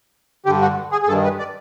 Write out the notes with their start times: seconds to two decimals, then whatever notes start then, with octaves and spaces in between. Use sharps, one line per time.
0.46 G2 D3 G4
0.62 F#4
0.92 G#4
1.03 G#4
1.07 G2 A4
1.11 D#3
1.24 B4
1.39 D5